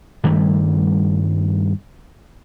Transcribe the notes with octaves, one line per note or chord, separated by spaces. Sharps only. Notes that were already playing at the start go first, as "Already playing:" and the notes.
G2 D#3 G3 A3